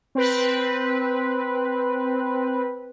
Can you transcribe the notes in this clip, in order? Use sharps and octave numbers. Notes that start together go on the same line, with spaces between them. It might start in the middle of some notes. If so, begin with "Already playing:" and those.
C4 B4